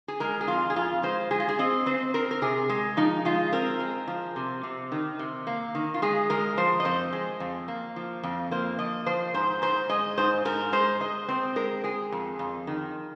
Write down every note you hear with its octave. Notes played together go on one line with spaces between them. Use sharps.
G#4
G#3 A#4
G#4
F2 F4
G#4
F2 F4
G#3 C5
G#3 G#4
F4
G#4
C4 D#5
C4 C5
C4 A#4
A#4
C3 G#4
G#3
F3 D#4
G#3 F4
C4 A#4
G#3
F3
C3
C3
D#3
C3
A#3
D#3
F4
G#3 G#4
G#3 A#4
F3 C5
D#5
F2 C5
G#3
F2
A#3
F3
F2
A#3 C5
F3 D#5
F3 C5
G#2 C5
G#2 C5
G#3 D#5
G#2 C5
G#2 A#4
G#3 C5
G#3 D#5
C4 C5
G#3 A#4
G#3 G#4
F2
F2
D#3